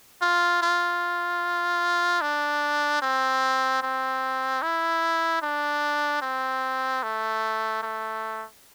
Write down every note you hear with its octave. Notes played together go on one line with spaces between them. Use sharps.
F4
F4
D4
C4
C4
E4
D4
C4
A3
A3